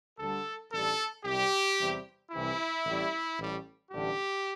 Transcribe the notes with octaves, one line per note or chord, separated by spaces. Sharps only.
D2 D3 G3 A4
A1 G2 G3 A4
C2 C3 G3 G4
E2 C3 G3
C2 C3 E3 E4
A1 A2 G3
A1 A2 G3
A1 G2 D3 G3 G4